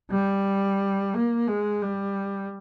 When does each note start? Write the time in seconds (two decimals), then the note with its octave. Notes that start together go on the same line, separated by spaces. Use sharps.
0.11 G3
1.14 A#3
1.48 G#3
1.82 G3